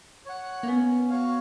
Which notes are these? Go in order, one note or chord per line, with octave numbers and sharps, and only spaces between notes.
C#5 F#5
A#3
B3 C#4
F#4 C#5 F5